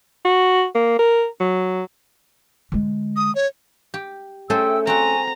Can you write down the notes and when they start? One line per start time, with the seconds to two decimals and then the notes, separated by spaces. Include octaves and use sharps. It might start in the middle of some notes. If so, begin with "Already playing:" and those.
0.25 F#4
0.75 A#3
0.99 A#4
1.40 F#3
2.72 D3 G#3
3.16 D#6
3.35 C#5
3.94 G4
4.50 A3 C#4 G#4 A4 C5 E5 G5 E6
4.87 C4 F#4 G#5 A#5 C#6